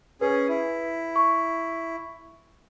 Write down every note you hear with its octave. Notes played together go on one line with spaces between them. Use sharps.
C#4 G#4 B4
E4
C#6